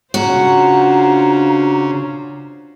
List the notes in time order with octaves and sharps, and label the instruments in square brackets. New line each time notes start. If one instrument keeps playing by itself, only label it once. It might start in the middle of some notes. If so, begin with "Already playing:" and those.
[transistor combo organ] C#3 [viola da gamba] D4 F4 C5 [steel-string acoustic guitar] F#4 [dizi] A#5